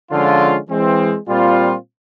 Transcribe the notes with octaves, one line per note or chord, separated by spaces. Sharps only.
D3 F3 G#3 C#4 F4
E3 G#3 C4
A#2 G3 C4 F4